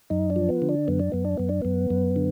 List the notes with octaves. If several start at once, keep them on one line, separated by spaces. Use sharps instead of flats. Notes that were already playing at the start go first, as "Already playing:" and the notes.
F#2 D#4
D4
F3
B3
D3
D4
F#2 B3
D4
F#2 B3
D4
F#2 B3
D4
F#2 B3
F#2
D3